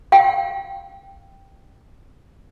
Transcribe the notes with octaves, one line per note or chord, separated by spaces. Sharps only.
F5 G5